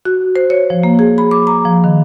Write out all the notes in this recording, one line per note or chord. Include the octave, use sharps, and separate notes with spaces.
F#4
C5
C#5
F3
A#3
G#4
B5
D6
A#5
F3
D#3